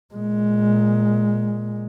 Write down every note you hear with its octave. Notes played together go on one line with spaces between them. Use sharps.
A#2 G#3